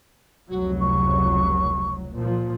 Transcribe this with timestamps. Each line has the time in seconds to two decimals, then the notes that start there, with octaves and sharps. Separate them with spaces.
0.50 F1 C#2 F#3 F#4
0.80 C#6
2.13 A#2 F3